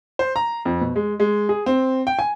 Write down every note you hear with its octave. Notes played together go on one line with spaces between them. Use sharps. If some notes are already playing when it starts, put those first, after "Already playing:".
C5
A#5
F2
B2
G#3
G#3
G#4
C4
G5
G#5